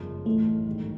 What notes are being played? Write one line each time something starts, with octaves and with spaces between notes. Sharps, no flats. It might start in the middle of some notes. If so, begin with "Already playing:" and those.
Already playing: G1 F#2 C#3 F3 G#3
B1 A2 E3 A3
A1 G#2 D#3 G3